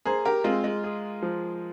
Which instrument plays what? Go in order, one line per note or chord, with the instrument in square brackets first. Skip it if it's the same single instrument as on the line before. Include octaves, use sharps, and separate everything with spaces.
[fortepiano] A#3 [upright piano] G#4 C5
[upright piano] G4 A#4
[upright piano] G#3 C4 [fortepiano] F4
[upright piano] G#3
[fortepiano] G#4
F3